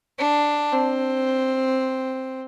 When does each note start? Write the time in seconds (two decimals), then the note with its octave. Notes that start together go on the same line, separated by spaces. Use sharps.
0.19 D4
0.72 C4